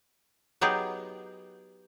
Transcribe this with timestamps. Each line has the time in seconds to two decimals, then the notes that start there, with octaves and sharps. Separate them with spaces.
0.61 F#3 B3 D#4 G4 G#4